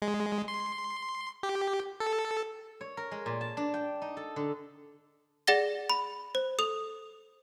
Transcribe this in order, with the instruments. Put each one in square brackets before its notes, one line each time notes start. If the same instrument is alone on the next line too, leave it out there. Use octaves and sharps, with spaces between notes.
[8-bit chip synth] G#3
C6
G4
A4
[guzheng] C#5
A#4
G#3
A#2
A5
D4
G5
D#4
A4
D3
[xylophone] G#4 D5 F#5 A6 A#6 G7
B5
C5
A4 D#6 F7